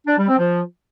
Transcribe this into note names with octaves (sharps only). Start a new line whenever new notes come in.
D4
G3
C4
F3